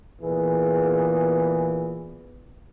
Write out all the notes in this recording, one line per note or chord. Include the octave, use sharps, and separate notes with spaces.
A#2 E3 B3 G#4